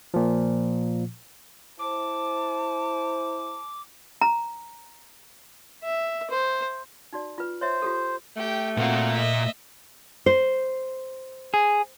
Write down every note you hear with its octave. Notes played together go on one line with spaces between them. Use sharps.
A#2 F3
E4 C5 A5 D6
A#5
E5
C5
D#4 F#4 D5
F4 B4
C5 C#5 E5
F4 G4 A4
A3 G4 G5
A#2 C4 F#4 F5
D#5 E5
C5
G#4